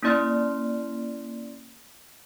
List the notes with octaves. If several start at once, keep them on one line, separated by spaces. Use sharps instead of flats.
A#3 C#4 E4 D5 C6 F6